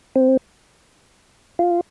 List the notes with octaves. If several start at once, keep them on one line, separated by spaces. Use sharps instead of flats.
C4
F4